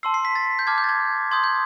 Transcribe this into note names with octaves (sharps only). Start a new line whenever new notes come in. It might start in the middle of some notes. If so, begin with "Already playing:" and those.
A5 C6 E6 C7
C7
B6
A6
G6
A5 D6 F6 G#6
G6
A6
G#6
C6 D#6 G6 G#6
G6